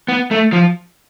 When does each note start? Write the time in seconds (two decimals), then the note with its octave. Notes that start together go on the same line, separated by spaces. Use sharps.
0.08 B3
0.31 A3
0.52 F3